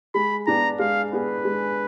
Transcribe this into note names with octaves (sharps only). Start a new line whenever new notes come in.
G#3 B5
B3 D4 G#4 A#5
G#3 F5
B3 D4 G#4 B4
G#3